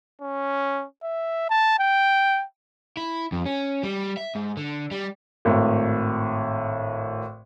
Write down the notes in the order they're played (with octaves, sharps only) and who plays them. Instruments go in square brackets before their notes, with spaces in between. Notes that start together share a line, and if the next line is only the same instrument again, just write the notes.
[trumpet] C#4
E5
A5
G5
[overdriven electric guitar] E4
F2
C#4
G3
E5
G#2
D3
G3
[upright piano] G#1 A2